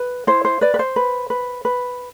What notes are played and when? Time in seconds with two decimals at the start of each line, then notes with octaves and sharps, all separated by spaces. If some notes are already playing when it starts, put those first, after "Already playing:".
Already playing: B4
0.27 E4 C5
0.45 C5
0.61 B4 D5
0.74 B4
0.79 C5
0.96 B4
1.30 B4
1.65 B4